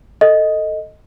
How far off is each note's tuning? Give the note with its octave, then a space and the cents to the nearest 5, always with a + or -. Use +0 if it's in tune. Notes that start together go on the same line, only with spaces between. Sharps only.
A4 +10 D#5 +0